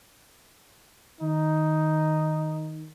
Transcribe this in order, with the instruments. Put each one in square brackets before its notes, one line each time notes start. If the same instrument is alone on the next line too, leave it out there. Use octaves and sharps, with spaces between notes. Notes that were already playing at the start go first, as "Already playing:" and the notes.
[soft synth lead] D#3 [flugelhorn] D#4